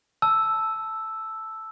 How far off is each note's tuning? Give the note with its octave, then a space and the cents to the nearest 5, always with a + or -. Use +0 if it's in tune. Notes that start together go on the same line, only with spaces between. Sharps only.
A5 +0 E6 +0